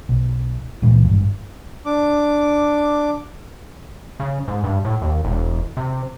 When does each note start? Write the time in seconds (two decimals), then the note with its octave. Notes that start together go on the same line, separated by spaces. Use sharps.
0.09 B1
0.82 C#2 A#2 E3
1.05 G#1 G2
1.86 D4 D6
4.20 C#3
4.48 G#2
4.64 G2
4.85 A2
5.02 D#2
5.25 E1
5.77 C3